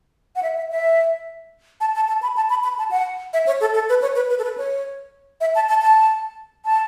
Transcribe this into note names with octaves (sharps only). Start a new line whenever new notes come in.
F#5
E5
E5
E5
A5
A5
A5
B5
A5
B5
B5
A5
F#5
E5
C#5
A4
A4
B4
C#5
B4
B4
A4
B4
C#5
E5
A5
A5
A5
A5